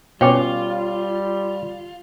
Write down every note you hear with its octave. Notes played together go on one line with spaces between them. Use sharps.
B2 G3 C#4 F4 C#5 G5 D6